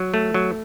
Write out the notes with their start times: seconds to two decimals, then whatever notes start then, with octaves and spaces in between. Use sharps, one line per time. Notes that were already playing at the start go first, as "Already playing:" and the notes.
Already playing: F#3
0.14 A3
0.34 F#3